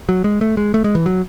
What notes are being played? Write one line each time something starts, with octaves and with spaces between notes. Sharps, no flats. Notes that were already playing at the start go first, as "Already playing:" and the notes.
F#3
G#3
A3
G#3
A3
G#3
E3
F#3